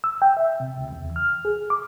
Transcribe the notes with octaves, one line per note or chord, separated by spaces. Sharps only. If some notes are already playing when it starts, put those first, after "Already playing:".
E6
G5
E5
C3
C#2
E2
F6
G#4
D6